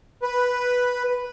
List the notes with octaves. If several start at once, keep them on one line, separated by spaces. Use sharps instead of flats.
B4